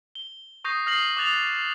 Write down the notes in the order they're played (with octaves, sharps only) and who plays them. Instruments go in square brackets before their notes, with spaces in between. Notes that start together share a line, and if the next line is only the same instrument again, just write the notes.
[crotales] G7
C#6 D#6 G6 A#6 C7
D#6 F6 A#6 C7 F#7
D6 D#6 F#6 A6 F7